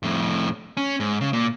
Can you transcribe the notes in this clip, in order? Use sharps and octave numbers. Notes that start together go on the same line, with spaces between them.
F2 A2
C#4
G#2
C#3
A#2